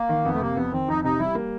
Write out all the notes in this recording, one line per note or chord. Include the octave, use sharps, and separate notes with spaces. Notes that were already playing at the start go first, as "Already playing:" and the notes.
Already playing: A#3
D#3
F2 B3
A3
C3 A#3
F2 B3
D#3 C4
F2 D#4
C3 D#4
G3 E4
A#3